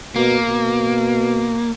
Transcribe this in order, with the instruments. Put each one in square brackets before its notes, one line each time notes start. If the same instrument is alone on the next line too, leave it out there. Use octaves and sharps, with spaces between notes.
[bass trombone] B2 [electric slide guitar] A#3
[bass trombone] B2